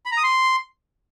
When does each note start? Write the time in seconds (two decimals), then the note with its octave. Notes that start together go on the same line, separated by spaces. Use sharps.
0.06 B5
0.12 A#5
0.17 D#6
0.23 C6